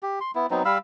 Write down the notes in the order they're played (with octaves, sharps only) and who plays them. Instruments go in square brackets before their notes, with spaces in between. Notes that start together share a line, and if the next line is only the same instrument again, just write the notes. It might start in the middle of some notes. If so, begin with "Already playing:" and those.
[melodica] G4
C6
B3 E4
F#3 B3 C4 D#4
G3 F5 B5 E6